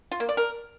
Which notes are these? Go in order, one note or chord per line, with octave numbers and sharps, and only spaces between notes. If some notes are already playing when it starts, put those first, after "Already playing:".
F4
A#3
D5
A#4